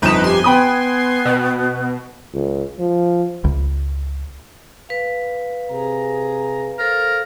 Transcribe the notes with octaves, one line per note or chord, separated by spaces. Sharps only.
G1 F2 D#4 B4 D7 E7
G4 G#5 C6
B3 G5 B5 D#6
B2
C#2
F3
C#2
B4 F5
C3 G#4 A#5
A4 A#4 C5 F5